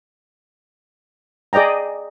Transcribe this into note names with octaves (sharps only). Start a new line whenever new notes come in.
G#4 D5 D#5 G5 A#5